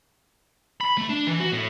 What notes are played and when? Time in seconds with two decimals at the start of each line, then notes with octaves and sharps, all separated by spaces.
0.81 B5
0.98 A3
1.09 D4
1.27 E3
1.40 F#4
1.52 A2